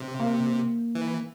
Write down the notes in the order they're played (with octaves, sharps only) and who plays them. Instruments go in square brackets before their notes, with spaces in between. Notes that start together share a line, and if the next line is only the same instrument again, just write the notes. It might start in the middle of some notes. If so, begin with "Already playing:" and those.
Already playing: [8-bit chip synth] C3
[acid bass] A#3
[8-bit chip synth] E3